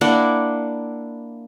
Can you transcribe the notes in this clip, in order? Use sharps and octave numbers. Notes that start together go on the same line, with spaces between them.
A#3 D4 E4 F#5